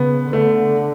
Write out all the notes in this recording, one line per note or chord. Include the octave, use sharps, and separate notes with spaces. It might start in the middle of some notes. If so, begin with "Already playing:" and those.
Already playing: C#3 B3
D3 A3